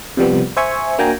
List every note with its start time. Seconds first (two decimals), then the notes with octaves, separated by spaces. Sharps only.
0.17 C3 F3 G3 B3
0.57 C5 E5 G#5 C#6
0.99 A#3 D4 F#4 G5 G#5 A#5